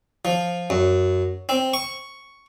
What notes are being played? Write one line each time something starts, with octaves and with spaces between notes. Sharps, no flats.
F3
F#2
C4
C#6